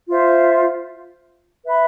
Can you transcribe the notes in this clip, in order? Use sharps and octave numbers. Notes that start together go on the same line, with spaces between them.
F4 C5 E5
B4 E5 B5